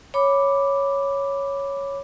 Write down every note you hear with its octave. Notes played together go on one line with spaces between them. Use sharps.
C#5 B5 D6